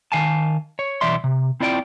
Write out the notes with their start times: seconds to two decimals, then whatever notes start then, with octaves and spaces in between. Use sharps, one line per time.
0.12 D#3 F5 G#5 A5
0.79 C#5
1.01 B1 E3 D5 E5 C6
1.24 C3
1.60 C4 E4 F4 D5 D#5 G5